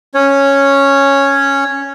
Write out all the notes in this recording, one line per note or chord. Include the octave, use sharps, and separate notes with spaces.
C#4 C#5